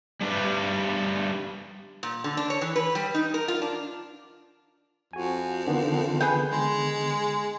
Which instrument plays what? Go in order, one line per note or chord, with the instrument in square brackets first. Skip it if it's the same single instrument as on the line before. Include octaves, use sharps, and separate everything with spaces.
[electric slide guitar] G3 A3 D4 G4 B4
[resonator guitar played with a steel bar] A#2
D3
D4
C#5
E3
B4
G3
D#4
A#4
F4
D4
[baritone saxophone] F2 [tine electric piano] F#4 G#5
[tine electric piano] D3 D#3 B3
[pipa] G#4 B4 G5
[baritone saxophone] G#3